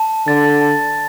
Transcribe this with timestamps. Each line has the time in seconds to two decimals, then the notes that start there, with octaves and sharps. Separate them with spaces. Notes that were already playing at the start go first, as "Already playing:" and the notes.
Already playing: A5
0.27 D3 A6
0.61 A5